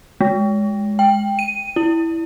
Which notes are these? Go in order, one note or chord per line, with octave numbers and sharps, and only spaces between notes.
G#3
G5
D#7
E4